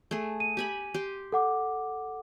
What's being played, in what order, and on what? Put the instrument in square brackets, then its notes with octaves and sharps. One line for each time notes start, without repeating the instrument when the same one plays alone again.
[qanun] A3 G#4
[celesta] D#7
[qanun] G4 G#5 B5
G4 C6
[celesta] A4 F#5 D6